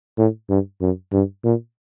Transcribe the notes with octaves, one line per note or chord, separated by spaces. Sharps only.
A2
G2
F#2
G2
A#2